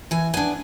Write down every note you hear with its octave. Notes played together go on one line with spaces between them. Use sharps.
E3 G#5
B3 D4 G#5